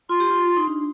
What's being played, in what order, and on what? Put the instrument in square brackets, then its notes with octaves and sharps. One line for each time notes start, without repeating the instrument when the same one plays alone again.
[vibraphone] F4 [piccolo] C6
[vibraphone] G4
F4
D#4
D4